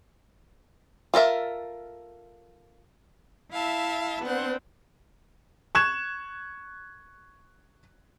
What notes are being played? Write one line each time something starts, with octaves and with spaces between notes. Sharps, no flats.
F4 A4 A#4 E5
E4 E5 F5 A5
B3 C4 D4 F#5
C#6 F#6 G#6 E7